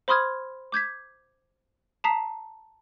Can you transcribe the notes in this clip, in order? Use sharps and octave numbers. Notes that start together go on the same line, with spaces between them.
C5 B5 C6 D#6 F6 G#6
D6 G6 G#6 B6
A5 A#5 D#6 B6 C7